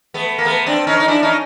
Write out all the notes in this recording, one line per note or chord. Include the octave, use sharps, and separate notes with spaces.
A3 B3
A#3
A3 B3
C4 D4
C#4 D#4
D#4
D4 E4
C#4 D#4